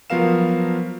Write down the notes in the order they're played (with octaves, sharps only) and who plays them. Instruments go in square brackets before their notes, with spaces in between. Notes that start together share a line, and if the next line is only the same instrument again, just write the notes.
[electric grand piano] F3 F#3 B3 A#4 F5 E7